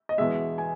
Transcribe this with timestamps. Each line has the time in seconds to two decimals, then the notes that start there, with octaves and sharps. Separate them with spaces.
0.09 D#5
0.18 E2 B2 G#3 E5
0.58 G#5